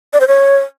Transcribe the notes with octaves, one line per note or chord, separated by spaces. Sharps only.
D5
C5
C#5